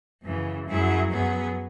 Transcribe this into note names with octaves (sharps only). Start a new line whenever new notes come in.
F#2 C#3 E3
F#2 F#3 E4 G#4
F#2 F#3 B3 G#4